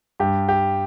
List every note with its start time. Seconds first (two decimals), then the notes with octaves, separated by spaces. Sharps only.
0.20 G2 G4
0.49 G4